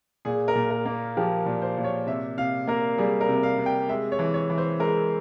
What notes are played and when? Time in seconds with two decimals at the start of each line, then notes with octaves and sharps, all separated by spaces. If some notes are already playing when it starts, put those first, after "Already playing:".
0.25 A#2 G#4
0.48 A#4
0.55 A#2
0.70 A#4
0.85 A#3
1.17 F3 G4
1.46 A#2
1.62 C5
1.77 A#2
1.84 C#5
2.07 C3 E5
2.37 C3 F5
2.68 A#3 A#4
2.98 G3 G#4
3.21 A#4
3.29 C3
3.43 F5
3.58 C3
3.66 G5
3.89 G#3 E5
4.12 C#5
4.19 E3
4.34 C#5
4.50 E3
4.58 C5
4.79 G#3 A#4